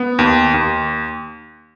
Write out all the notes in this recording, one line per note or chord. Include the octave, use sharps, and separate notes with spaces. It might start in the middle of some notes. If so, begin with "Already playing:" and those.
Already playing: B3
D#2
D#2